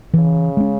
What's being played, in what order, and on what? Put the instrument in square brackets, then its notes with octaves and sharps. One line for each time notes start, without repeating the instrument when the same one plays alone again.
[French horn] C#3 [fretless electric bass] E3
[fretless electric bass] G#3 C#4